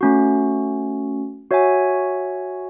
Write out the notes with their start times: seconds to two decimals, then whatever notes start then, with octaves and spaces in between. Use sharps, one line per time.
0.01 A3 C#4 F#4
1.51 F#4 C#5 E5 G#5